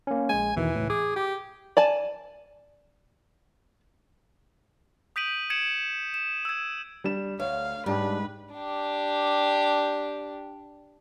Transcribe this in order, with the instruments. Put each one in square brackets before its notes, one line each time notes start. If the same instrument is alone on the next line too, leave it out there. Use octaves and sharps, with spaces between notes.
[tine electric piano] A#3 C#4
[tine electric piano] A#1 G#3 [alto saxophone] G#5
[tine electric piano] E2 B2 D#3 [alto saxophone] E3
[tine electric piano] C#2 A2
[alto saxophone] G#4 [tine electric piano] D6
[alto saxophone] G4
[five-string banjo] D5 G#5 A5
[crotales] D#6 G6 B6 D7 D#7 F#7
G#6 C#7 D7 E7 F#7
E7
E6 G#6
[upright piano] G3 D4 E7
[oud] D2 [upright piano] C#5 [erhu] F5
[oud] G#2 [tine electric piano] G3 D4 G4 [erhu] B4
[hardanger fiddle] D4 G4